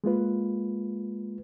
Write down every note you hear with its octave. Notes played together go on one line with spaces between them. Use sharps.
G#3 A#3 F4 B4